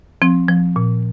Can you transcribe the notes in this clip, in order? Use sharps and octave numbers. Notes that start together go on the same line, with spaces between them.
F3 C4
F3
A#2